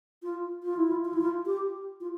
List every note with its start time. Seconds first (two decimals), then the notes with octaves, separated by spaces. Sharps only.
0.23 F4
0.63 F4
0.77 E4
0.91 F4
1.05 F4
1.13 E4
1.21 F4
1.46 G4
2.01 F4